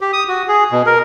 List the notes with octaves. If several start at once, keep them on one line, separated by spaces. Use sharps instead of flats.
G4
D#6
F#4
G#4
B2
A#4